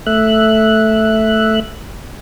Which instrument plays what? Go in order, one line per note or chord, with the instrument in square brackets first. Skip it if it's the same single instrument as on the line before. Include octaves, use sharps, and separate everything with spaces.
[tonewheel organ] A3 E5 F#6